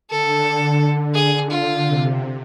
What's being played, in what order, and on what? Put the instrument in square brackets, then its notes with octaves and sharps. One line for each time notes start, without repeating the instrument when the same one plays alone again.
[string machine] D3 [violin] A4
[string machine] D3 [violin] G#4
[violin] F4
[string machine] C3